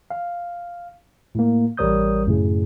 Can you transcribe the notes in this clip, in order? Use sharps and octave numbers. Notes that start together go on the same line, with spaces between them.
F5
A2 A#3
A1 G3 A#4 C#5 D#6 G6
F#2 A2 C#3